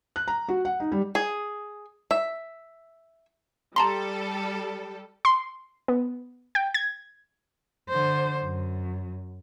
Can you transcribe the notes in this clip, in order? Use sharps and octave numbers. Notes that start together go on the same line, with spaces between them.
F#6
A#5
F#4
F#5
D#4
G3
G#4
E5
G3 A4 A5 A#5 C6
C6
B3
G5
G#6
D3 C5
F#2